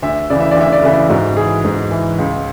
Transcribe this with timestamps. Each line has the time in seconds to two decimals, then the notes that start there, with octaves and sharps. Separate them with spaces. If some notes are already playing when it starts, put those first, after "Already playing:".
0.02 D2 E5
0.30 C#3 E3 D5
0.40 E5
0.51 D5
0.56 D2 E5
0.72 D5
0.83 C#3 E3 E5
0.93 D5
1.10 G#2 F#4
1.37 E3 G#4
1.65 G#2
1.91 E3
2.18 C#2